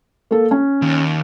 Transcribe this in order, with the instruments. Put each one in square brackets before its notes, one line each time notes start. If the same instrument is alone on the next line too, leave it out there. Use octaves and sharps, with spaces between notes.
[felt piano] A#3 A4
C#4
[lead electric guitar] D#2